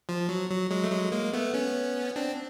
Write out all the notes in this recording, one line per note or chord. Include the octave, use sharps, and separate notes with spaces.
F3
F#3
F#3
F#3 G#3
A3
F#3 G#3
G#3 A#3
A3 B3
B3 C#4
C4 D4